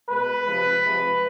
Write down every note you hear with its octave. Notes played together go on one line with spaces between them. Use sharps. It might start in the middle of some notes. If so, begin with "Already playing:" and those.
B2 G#3 B4
C3 F3 G#3
C3 F3 G#3